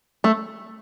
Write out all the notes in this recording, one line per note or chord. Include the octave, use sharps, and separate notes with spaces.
A3